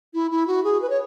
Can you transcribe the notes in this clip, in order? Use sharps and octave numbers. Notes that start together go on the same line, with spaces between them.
E4
E4
F#4
G#4
B4
C#5